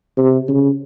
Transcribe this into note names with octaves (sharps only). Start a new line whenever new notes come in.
C3
C#3